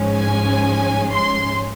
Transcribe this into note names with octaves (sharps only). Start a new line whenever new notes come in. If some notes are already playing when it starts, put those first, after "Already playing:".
Already playing: G#2 F3 G#3 C#4
G#5
C6